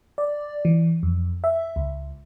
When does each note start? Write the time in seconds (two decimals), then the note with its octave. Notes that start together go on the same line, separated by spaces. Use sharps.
0.18 D5
0.65 E3
1.03 F2
1.44 E5
1.76 C#2